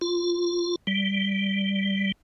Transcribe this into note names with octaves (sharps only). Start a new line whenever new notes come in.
F4
G3